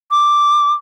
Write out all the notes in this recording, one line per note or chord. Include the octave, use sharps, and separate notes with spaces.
D6